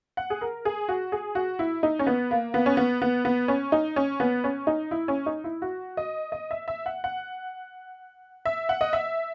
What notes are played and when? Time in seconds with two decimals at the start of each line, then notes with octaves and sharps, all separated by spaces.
0.17 F#5
0.30 G#4
0.41 A#4
0.65 G#4
0.88 F#4
1.12 G#4
1.35 F#4
1.59 E4
1.83 D#4
1.99 C#4
2.07 B3
2.31 A#3
2.54 B3
2.66 C#4
2.77 B3
3.02 B3
3.25 B3
3.48 C#4
3.72 D#4
3.96 C#4
4.20 B3
4.44 C#4
4.67 D#4
4.91 E4
5.08 C#4
5.26 D#4
5.44 E4
5.62 F#4
5.97 D#5
6.32 D#5
6.51 E5
6.68 E5
6.86 F#5
7.04 F#5
8.45 E5
8.69 F#5
8.81 D#5
8.93 E5